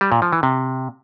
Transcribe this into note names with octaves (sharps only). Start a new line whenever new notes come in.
G3
A#2
F3
E3
C3